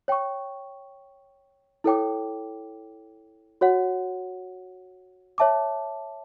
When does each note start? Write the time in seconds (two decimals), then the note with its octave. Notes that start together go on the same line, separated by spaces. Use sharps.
0.08 C#5 G5 C#6
1.84 E4 A4 C#5 G5 D6
3.61 F#4 C#5 F#5
5.38 C#5 E5 A5 D6